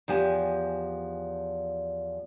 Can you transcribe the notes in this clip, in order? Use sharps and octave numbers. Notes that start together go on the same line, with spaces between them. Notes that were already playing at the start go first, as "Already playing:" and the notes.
E2 F3 G4 G#5